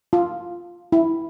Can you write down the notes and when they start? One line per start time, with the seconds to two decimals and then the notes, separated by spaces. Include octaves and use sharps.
0.13 F4
0.92 E4